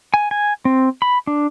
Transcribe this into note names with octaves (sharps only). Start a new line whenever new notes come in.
G#5
G#5
C4
B5
D4